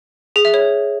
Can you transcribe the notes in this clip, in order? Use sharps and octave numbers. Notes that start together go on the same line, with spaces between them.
G#4
E5
C#5